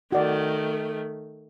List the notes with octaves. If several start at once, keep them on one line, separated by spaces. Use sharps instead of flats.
D#3 A3 F#4 D5